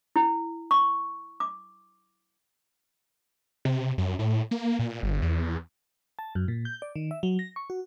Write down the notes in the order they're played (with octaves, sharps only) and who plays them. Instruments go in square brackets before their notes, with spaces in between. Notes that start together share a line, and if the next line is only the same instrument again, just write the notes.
[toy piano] E4
C#6
D6
[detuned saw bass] C3
F#2
A2
A#3
A#2
G1
E2
[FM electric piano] A5
F#2
A#2
G6
D5
D#3
E5
F#3
A#6
C#6
F#4